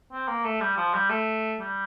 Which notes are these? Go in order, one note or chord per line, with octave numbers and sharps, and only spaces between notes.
C4
A#3
A3
G3
F3
G3
A3
G3